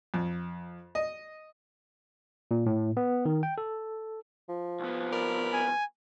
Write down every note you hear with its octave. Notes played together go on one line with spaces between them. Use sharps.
F2
D#5
A#2
A2
B3
D#3
G5
A4
F3
C2 B3
A#4 D5 B5
G#5